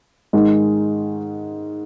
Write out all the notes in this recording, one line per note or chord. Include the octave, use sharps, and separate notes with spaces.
G#2 D#3 G#3